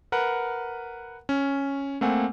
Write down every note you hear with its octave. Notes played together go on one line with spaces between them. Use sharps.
A#4 B4 F#5
C#4
A3 A#3 C4 F#5 G#5